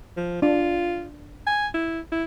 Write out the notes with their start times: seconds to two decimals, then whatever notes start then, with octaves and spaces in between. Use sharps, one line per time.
0.17 F3
0.42 D4 F4
1.47 G#5
1.74 E4
2.12 E4